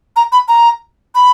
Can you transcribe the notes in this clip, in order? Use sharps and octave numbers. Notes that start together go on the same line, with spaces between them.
A#5
B5
A#5
B5